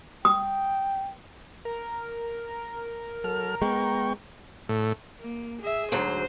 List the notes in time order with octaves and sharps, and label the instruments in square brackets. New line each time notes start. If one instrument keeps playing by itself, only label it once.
[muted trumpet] G5 [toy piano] D#6
[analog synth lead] A#4
[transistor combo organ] F#3 A4 F6
[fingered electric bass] G#3 [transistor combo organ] B3 G5 C#6
[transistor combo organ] A2
[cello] A#3
G#4 E5
[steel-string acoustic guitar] D2 G#2 F#3 [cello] C5